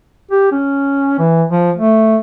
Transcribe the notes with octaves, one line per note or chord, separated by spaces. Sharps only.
G4
C#4
E3
F3
A3